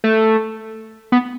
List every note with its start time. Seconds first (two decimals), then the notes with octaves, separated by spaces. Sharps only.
0.04 A3
1.12 B3